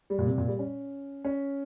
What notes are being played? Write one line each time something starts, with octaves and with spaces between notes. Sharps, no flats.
G3
A#2
C3
A#2
G3
C#4
C#4